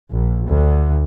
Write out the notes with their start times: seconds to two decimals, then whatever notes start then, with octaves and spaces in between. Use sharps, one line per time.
0.12 A#1
0.48 D2